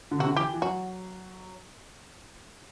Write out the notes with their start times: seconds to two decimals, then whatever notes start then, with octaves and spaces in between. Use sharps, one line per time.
0.11 D3
0.19 C3 F#4
0.26 D3
0.36 E3 G4
0.54 E3
0.62 F#3 F#4